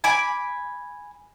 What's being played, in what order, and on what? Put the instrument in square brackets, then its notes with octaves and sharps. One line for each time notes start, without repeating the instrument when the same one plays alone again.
[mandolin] G#5 B5 D6